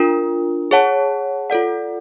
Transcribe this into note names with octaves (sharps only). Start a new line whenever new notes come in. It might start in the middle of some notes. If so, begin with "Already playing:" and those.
Already playing: D4 F4 A#4
G#4 C#5 F#5 A5
F4 A4 D5 F#5